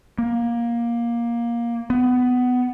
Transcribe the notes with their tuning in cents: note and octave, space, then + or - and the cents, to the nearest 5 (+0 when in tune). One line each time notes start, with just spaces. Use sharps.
A#3 +15
B3 +15